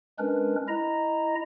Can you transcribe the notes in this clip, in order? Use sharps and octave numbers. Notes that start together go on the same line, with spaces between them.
G#3 C#4 D4 A#4 B4
E4 D#5 A#5